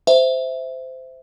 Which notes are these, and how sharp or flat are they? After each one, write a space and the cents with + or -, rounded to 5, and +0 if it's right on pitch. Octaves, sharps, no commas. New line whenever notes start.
C5 -15 E5 +0